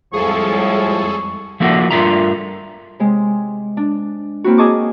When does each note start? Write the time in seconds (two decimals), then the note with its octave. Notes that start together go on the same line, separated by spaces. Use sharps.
0.13 F2 A2 F3 G3 G#3 G#4 A4 C#6
1.60 F3 A3 A#3 E4 F#4
1.91 G2 A3 F4 A#4 E5 A#5
3.00 C3 G#3
3.77 D4
4.44 A#3 C4 E4 F#4
4.58 G#4 D#5 A5 C#6 D6